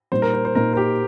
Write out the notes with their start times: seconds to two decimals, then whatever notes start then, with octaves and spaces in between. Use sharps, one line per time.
0.12 A#2 G3 D#4 C5
0.22 A#4
0.34 C5
0.45 C5
0.55 A#2 A#3 D#4 A#4
0.73 A#4
0.77 G4